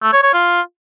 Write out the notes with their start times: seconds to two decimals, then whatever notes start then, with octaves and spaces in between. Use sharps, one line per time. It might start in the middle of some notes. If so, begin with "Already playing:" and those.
0.03 A3
0.13 C#5
0.23 C#5
0.34 F4